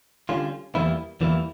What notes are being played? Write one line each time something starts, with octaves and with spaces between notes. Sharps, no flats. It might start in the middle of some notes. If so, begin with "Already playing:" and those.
D3 G3 C#4 F4
E2 E3 G3 A#3 E4
E2 E3 G3 A#3 E4